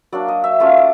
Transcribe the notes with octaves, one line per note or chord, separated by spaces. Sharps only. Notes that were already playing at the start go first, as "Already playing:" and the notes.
F#3 A#3 D4 D5
D#5
E5
A3 C#4 F4 F5
D5